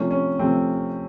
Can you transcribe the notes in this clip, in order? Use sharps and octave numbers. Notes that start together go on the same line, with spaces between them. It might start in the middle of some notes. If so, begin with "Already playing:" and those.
Already playing: C3 F3 A3 C#4
C#4
C3 F3 A3 C4